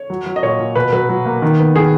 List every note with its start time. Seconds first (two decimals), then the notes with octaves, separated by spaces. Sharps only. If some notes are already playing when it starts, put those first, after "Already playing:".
Already playing: C#5
0.10 F#3
0.26 F#3
0.36 D#5
0.43 A#2 C#5
0.59 A#2
0.76 B2 B4
0.92 F#3 B4
1.09 F#3
1.25 A#3
1.42 D#3
1.59 B3
1.76 D#3 G#4